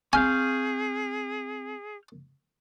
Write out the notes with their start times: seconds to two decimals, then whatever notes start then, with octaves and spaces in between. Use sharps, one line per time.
0.13 C4 G#4 F5 G#5 C#6 F6 G6